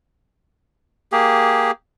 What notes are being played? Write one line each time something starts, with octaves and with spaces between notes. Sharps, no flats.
A#3 G4 G#4